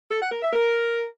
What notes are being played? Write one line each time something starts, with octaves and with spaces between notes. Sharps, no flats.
A4
F#5
A#4
E5
A#4